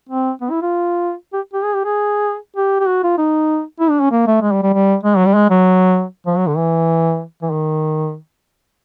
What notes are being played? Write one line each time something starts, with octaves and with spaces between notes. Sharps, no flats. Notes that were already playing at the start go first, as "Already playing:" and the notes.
C4
B3
E4
F4
G4
G4
G#4
G4
G#4
G4
G4
F#4
F4
D#4
E4
D4
C#4
A#3
A3
G#3
G3
G3
G3
G#3
F#3
G3
G#3
F#3
F3
F#3
D3
E3
E3
D#3